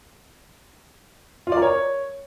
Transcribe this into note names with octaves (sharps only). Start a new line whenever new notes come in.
F4
D5
A#4
C#5